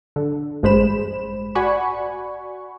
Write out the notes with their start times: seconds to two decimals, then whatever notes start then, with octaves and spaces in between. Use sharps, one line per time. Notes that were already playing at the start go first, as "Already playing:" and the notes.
0.16 D3
0.63 A1 G2 G#3 C5 B5 E7
1.55 F#4 D5 F#5 G#5 B5 C#6